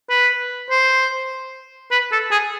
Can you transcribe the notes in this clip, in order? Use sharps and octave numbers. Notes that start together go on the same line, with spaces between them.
B4
C5
B4
A4
G#4